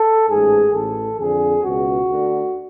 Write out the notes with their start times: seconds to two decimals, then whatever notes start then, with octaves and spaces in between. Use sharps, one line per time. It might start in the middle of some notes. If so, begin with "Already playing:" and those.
Already playing: A4
0.28 A1 G#2 G#4
0.74 A1 A2 A4
1.19 F2 D3 G#4
1.64 C#2 B2 F#4
2.09 D2 D3